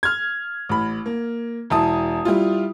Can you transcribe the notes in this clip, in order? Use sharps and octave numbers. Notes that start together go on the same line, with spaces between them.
F6 G#6
A1 B5
A#3
E1 E4 A5 D#6
G3 E4 F4